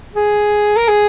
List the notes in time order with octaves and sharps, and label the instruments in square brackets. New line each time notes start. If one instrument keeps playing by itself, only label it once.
[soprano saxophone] G#4
A#4
G#4